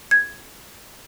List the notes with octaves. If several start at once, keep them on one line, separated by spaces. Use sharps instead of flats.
G#6